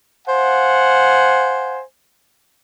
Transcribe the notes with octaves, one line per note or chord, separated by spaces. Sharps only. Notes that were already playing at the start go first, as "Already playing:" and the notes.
C5 F5 F#5 G#5